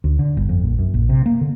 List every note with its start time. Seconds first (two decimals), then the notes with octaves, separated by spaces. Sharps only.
0.04 D2
0.19 D3
0.37 G1
0.49 F2
0.64 A#1
0.79 F#2
0.94 A#1
1.09 C3
1.26 A#3
1.41 D3